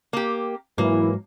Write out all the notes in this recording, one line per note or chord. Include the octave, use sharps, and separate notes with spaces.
A#3 G4
G#2 E3 F#3 A#3